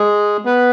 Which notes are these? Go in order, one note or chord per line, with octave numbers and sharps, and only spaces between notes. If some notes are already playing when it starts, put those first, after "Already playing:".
Already playing: G#3 G#4
B3 B4